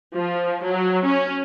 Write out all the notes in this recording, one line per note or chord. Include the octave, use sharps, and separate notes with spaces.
F3
F#3
C#4